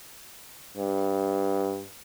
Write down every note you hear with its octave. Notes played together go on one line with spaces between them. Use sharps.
G2